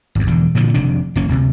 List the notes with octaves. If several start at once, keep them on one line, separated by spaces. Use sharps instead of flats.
G#1 E2
E1 E2 D3
A#2 D3 E3 F3
F1 C3 D#3 D4
F#1 A#3 C#4
D1 D2 C3